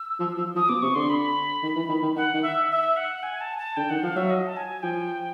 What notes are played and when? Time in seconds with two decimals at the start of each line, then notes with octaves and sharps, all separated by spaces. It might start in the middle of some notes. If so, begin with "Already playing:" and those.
Already playing: E6
0.20 F3
0.38 F3
0.55 F3 D#6
0.69 B2 D6
0.82 C3 C#6
0.95 D3 C6
1.09 B5
1.63 D#3
1.76 E3
1.89 D#3
2.03 D#3
2.16 D#3 F#5
2.34 D#3
2.42 E5
2.70 E5
2.97 F#5
3.23 G#5
3.41 A5
3.58 A5
3.77 D3 G5
3.90 D#3 F#5
4.03 F3 F5
4.16 F#3 E5
4.30 D#5
4.46 A5
4.57 G#5
4.83 F3 G5